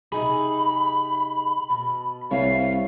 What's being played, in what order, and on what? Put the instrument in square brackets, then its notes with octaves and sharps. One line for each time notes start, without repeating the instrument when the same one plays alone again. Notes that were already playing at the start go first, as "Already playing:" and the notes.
[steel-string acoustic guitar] C3 D#4 G#4 [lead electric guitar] B5
[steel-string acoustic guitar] B2
[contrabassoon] C2 [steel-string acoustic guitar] C#5 E5 [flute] F5